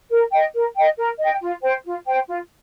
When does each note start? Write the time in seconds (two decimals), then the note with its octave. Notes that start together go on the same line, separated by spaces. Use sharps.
0.09 A#4
0.31 D#5 G5
0.53 A#4
0.75 D#5 G5
0.97 A#4
1.18 D#5 G5
1.40 F4
1.62 C5 G5
1.84 F4
2.06 C5 G5
2.27 F4